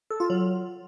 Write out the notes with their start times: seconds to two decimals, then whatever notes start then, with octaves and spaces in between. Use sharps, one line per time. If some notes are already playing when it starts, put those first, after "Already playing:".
0.10 A4
0.20 F4
0.30 F#3